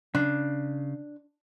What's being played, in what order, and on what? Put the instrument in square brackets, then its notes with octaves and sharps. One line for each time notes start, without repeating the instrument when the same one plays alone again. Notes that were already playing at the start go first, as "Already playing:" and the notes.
[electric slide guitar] C#3 [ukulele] D4